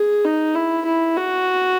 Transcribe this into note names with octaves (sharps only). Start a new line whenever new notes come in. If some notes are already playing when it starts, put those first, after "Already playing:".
Already playing: G#4
D#4
E4
E4
F#4